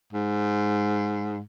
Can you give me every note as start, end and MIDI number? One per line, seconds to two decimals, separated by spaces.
0.13 1.40 44